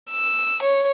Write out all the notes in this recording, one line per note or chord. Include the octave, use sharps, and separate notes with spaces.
E6
C#5